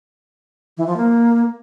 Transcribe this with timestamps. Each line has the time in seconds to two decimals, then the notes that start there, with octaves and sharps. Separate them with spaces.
0.77 E3
0.87 F3
0.97 A#3